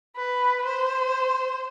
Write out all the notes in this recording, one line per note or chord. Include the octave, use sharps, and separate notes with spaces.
B4
C5